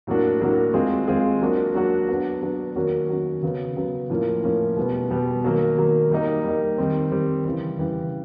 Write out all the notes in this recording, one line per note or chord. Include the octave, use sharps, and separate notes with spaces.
A2 F#3 A#3 D4 F#4
A2 F#3 A#3 D4 F#4
G#3 C4 F4 G#4
G#3 C4 F4 G#4
F#3 A#3 D4 F#4
F#3 A#3 D4 F#4
F#3 B3 D4
F#3 B3 D4
D#3 F#3 A#3 C#4 F#4
D#3 F#3 A#3 C#4 F#4
C#3 F#3 B3
C#3 F#3 B3
A2 F3 A#3 C#4
A2 F3 A#3 C#4
B2 G3 B3
B2 G3 B3
D#3 F#3 A#3
D#3 F#3 A#3
G3 A#3 D#4
G3 A#3 D#4
D#3 G3 C4
D#3 G3 C4
C#3 E3 G3
C#3 E3 G3